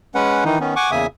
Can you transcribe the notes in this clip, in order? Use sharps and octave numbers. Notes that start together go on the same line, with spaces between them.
G#3 C#4 B4 F#5
D#3 E3 D#4
D#3 B3 C#4
F#5 G#5 C#6 D6
E2 C#3 A#3 E5 G#5 D#6